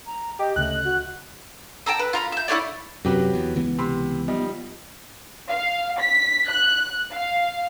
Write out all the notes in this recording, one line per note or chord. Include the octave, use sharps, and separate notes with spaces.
A#5
G4 D#5
D2 C#3 A3 F#6
F#4
G5 A5 A#5 E6
B4
F4 A#5 B5
E5 G6
E4 B4 C#5 D5
F#2 C3 F#3 G4 B4
E2
C#2 E3 B3
C3 B5 C6
F3 G3 B3 D#4
F5
B6
F#6
F5